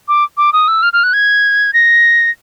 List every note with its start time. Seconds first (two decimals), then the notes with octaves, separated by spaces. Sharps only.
0.08 D6
0.37 D6
0.53 D#6
0.68 E6
0.82 F6
0.93 F6
1.03 F#6
1.13 G#6
1.73 A#6